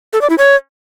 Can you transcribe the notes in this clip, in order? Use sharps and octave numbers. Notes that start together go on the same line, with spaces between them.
A4
D5
E4
C#5